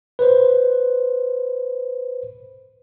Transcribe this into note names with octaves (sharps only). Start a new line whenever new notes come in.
B4 C5